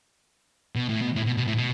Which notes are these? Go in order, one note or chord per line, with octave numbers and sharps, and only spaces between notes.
B2
A2
B2
A2
B2
B2
A2
B2